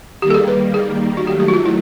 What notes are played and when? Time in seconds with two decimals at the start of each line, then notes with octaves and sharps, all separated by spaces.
0.22 D#3 G3 A#3 G4
0.30 A4
0.34 G#4
0.48 B4
0.74 G#4
1.17 F#4
1.26 D#3 F#3 A3 G4
1.40 G4
1.48 F#4
1.54 F4
1.66 E4